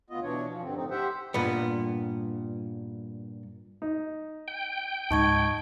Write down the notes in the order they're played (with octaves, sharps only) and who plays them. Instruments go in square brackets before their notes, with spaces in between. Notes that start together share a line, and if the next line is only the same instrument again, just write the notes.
[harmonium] D2 B3 F4 D#5
B2 E3 D4 C#5
F3
G2 D3 C4
A2 C4 D#4
G4 C5 E5 F#5 G5
[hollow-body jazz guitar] G2 A#2 B3
[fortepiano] D#4
[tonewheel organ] G5
[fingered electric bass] C#2 G#2 G#3 [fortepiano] D#4 [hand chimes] A5 C#6 G#6